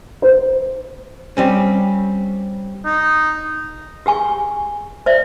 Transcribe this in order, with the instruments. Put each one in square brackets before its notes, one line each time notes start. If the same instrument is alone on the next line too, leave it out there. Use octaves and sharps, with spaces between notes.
[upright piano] C5
[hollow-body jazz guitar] G3 C4 C#4
[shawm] D#4
[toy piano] G4 G#4 G#5 C#6
C5 D5 E5